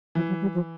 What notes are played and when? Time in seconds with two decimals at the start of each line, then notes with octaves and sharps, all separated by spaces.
0.15 E3 F3
0.28 F#3
0.42 G3
0.54 F3